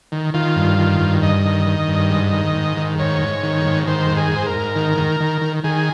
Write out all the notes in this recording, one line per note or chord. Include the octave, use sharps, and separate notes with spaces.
D#3
D#3 F4
G2
D#3
G2
G2 D#5
D#3
D#3
G2
G#2
D#3
G#2
D#3
G#2 C#5
G#2
D#3
G#2
D#3 C5
G#2
G#4
G#2 C5
A#4
G#2
D#3
D#3
D#3
D#3
D#3 G#4